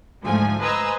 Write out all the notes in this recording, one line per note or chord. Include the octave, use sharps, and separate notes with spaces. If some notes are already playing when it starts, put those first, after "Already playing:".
D2 G#2 F3 A3 G#5
B4 C5 D#5 G#5 A#5 E6